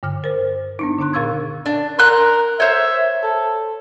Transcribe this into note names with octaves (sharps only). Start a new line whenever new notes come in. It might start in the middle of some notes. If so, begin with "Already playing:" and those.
G2 D3 F6
A#4 C5
B3 D4 D#4
D3 D4 D#4 C6 F#6
A#2 A#4 F5 C#6 E6 G#6
D4
A#4 C6 F#6
C5 C#5 E5
A4